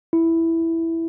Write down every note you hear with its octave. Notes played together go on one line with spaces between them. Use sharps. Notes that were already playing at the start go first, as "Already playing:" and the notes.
E4